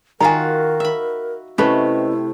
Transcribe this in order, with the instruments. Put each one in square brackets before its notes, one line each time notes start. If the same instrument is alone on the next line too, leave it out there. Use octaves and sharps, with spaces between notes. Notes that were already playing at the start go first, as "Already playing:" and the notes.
[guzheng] D#3 F4 F#4 [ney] A#4 [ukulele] G#5 A#5
[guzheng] E5 B5
[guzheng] C3 A3 [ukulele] C#4 B4 D#5 [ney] E4